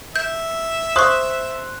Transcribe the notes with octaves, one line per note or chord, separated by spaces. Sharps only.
E5 G6
C5 C6 C#6 D#6 F#6